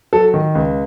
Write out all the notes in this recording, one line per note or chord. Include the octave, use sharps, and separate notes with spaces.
F#3 A4
D#3
C#2